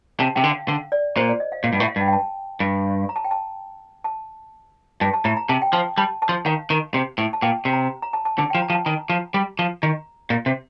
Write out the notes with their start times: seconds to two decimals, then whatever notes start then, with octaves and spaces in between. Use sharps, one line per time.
0.20 C3 A5
0.36 C3 G5
0.44 D3
0.51 F5
0.68 D3 F5
0.92 D5
1.17 A#2 C5
1.29 D5
1.40 D#5
1.52 F5
1.64 A#2
1.73 G2
1.76 F5
1.80 A2
1.88 F5
1.96 G2 G5
2.08 G5
2.13 A5
2.60 G2
3.09 A#5
3.16 A5
3.24 G5
3.31 A5
4.04 A5
5.01 G2 A5
5.13 A5
5.25 A2 A#5
5.37 A#5
5.49 C3 A5
5.62 G5
5.73 F3 A5
5.98 G3 A5
6.22 A5
6.29 F3
6.46 D#3 F5
6.70 D#3
6.94 C3
7.18 A2
7.33 A5
7.42 A#2 G5
7.65 C3
7.73 A#5
8.02 A#5
8.13 A5
8.25 A5
8.38 D3 A5
8.50 G5
8.55 F3
8.62 A#5
8.70 F3
8.75 A5
8.85 D#3 A#5
9.10 F3
9.34 G3
9.59 F3
9.83 D#3 A#5
10.30 A#2
10.46 C3